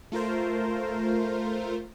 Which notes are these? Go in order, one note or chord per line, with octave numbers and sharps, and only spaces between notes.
A3 F4 A#4 C5